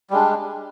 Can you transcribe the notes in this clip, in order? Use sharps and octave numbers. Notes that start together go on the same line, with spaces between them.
G3 G#3 D4